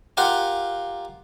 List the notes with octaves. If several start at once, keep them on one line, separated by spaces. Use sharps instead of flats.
F4 G4 A#4 F5 F#5